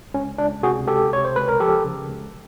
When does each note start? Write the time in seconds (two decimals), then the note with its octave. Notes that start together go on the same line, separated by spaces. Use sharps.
0.14 C#2 C#4
0.38 C#2 D4
0.63 C3 F#4 G#4
0.87 C#2 G4 A4
1.11 C3 C#5
1.25 C5
1.36 C#2 B4
1.48 A#4
1.60 F3 G4 A4
1.85 C#3
2.08 C#2